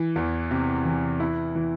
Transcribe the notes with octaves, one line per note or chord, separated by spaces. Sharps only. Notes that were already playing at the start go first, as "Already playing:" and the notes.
Already playing: E3
E2
C3
E3
E4
E3